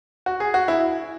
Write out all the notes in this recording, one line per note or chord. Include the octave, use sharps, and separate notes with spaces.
F#4
G#4
F#4
E4